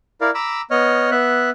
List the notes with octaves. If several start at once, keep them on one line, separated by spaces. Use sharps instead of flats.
E4 A#4 D5 F5
A#5 B5 D6 E6
B3 C#5 D#5 F6
B3 E5 F#6